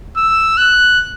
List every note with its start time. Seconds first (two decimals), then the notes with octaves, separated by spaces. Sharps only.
0.17 E6
0.58 F#6